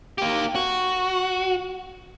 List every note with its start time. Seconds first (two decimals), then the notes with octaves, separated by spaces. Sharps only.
0.18 A#3 G4
0.55 F#4